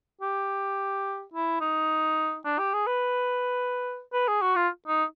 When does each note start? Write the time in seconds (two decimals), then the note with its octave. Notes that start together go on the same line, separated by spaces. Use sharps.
0.21 G4
1.34 E4
1.61 D#4
2.45 D4
2.59 G4
2.74 G#4
2.87 B4
4.13 B4
4.28 G#4
4.42 F#4
4.56 F4
4.88 D#4